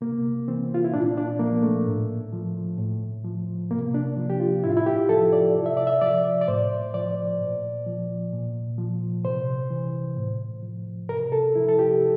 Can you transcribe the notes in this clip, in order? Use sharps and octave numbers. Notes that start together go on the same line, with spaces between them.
C3 A#3
E3 C4
F4
E4
A#2 D4
D4
F3 A#3
A3
A2
F3
A2
F3
C3 A#3
D4
F3
G4
F4
A2 E4
F4
E4
G4
F3 A4
D5
C3
E5
D5
E5
F3 D5
D5
A2 C5
F3 D5
A#2
F3
A#2
F3
C3 C5
E3
A2
F3
C3 A#4
A4
F3 E4
A4
G4